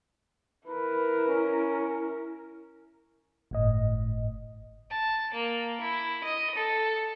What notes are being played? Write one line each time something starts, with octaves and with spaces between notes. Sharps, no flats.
E4 A#4 B4
C#4
G1 A2 D#5
A5
A#3
E4
D#5
A4